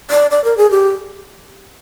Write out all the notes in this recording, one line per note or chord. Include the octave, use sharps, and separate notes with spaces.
D5
D5
A#4
G#4
G4